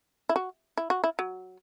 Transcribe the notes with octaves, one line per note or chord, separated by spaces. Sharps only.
E4
F#4
E4
F#4
E4
F#3